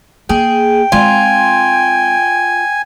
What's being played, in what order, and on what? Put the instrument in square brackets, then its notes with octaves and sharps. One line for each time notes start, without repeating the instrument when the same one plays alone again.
[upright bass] A#3 [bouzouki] G#4 [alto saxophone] G5
[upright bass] G#3 C4 [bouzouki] F4 [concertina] G#5